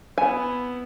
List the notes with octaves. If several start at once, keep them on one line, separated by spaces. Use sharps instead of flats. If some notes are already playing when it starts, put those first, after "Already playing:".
B3 E4 G#5